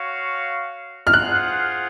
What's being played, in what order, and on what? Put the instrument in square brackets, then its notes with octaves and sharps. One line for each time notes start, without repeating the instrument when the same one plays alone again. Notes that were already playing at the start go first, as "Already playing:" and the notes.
Already playing: [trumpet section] F#4 C#5 F5
[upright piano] F6
[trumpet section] F4 G#4 C5 F#5 [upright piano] F#6